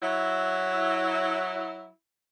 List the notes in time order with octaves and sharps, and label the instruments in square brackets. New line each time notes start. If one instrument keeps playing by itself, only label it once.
[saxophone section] F#3 E4